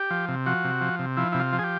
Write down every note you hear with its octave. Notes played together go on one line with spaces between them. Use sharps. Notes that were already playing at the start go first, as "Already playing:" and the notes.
Already playing: G4
F3
C3
F3 F#4
C3
F3
C3
F3 E4
C3 E4
F4
F3
G#4
G4